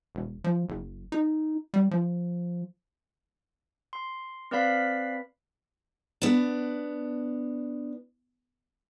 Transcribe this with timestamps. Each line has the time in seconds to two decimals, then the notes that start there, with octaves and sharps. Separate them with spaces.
0.15 E1
0.44 F3
0.69 F#1
1.12 D#4
1.74 G3
1.91 F3
3.93 C6
4.51 C4 B4 D5 F5 B5 B6
6.22 B3 D4